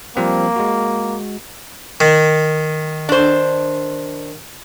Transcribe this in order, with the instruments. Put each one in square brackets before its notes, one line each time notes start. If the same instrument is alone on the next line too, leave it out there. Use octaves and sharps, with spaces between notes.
[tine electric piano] F3 G3 C4 [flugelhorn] A#3
[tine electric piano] G#3 F#4
[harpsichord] D#3
[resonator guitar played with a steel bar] D4 C5